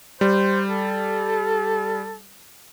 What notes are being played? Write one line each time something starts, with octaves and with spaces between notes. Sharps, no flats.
G3 C5
A4